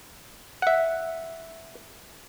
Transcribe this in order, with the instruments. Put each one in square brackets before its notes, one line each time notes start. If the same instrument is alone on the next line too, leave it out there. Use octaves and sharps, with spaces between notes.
[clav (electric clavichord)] E5 F#5